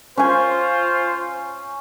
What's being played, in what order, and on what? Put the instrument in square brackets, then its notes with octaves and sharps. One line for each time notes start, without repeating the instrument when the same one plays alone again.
[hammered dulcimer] C#4 G#5 [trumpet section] F4 C5